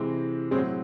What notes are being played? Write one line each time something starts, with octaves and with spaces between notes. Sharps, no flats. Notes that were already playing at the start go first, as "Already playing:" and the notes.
Already playing: C3 E3 G#3 C4
A2 F#3 G#3 C4